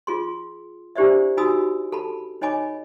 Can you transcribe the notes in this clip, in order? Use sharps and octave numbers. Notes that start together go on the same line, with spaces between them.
F4 G#4 C6
D4 E4 G4 C5 D5 E5
D#4 F#4 G#5 B5 D#6 E6
A4 A5 B5
D#4 C#5 D#5 G#5 B5 D6